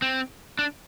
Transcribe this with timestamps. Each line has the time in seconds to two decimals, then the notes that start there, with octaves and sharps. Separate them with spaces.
0.02 C4
0.59 D4